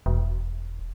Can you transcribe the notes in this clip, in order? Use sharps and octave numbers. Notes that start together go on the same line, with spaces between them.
E1